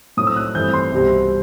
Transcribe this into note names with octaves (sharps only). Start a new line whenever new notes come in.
A2 F#3 A3 C4 D#6
E6
F#6
G2 E3 A3 C4 G6
C6
C2 B2 G3 C4